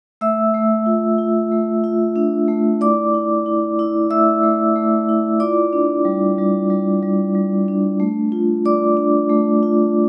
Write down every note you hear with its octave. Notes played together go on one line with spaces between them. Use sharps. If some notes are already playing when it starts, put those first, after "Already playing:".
A3 E5 E6
A3
F4
F4
A3
F4
D4
A3
E4 D5 D6
E4
E4
E4
A3 E5 E6
A3
A3
E4
F4 D5 D6
D4
G3
G3
G3
G3
G3
D4
A3
F4
F4 D5 D6
D4
A3
F4